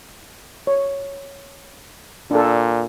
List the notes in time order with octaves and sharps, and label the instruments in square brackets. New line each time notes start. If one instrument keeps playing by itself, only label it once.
[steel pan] C#5
[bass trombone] A#2 [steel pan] D4 A4